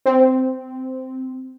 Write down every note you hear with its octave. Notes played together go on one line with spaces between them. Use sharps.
C4